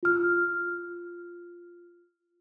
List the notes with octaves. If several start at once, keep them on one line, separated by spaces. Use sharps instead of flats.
F4 F6